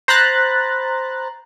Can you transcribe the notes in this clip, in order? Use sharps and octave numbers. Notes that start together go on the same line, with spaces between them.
C5 A#5 B5 F#6 A6